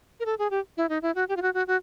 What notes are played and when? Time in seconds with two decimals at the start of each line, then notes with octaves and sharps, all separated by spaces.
0.20 A#4
0.26 A4
0.39 G#4
0.51 G4
0.77 E4
0.89 D#4
1.02 E4
1.15 F#4
1.29 G4
1.37 F4
1.42 F#4
1.54 F#4
1.67 F#4